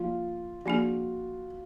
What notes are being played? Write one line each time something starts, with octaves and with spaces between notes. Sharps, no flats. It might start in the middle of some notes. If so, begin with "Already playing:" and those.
Already playing: F3 A#3 F4
F3 A#3 D4 F#4 G#4